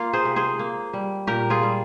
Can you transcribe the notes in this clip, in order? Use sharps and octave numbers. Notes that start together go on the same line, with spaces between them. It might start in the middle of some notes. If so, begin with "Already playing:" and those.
Already playing: A#3 F4
G#4 C5
C3
G#4 C5
A#3
G3
A#2 G4 A#4
F4 G#4
G3